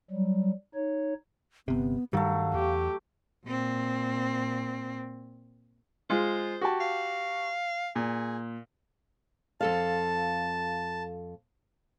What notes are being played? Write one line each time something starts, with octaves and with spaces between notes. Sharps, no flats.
F#3 G3
D#4 C#5
G1 C3 B3
G2 D#3 F#3 G3 A3 F5
E2 G4
A#2 C4
G#3 F4 C5
F#4 G4 A5
F5
A#2 G#4
F2 A4 F5 A5